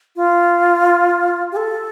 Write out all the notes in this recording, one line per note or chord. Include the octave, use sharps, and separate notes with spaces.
F4
G4
A4